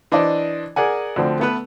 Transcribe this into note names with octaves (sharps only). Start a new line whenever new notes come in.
E3 D4 C5 D5 D#5
G#4 A#4 D5 F#5 G#5
D2 D3 F3 C4
A3 B3 B4